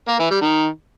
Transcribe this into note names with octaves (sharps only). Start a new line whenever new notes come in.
A#3
E3
G3
D#3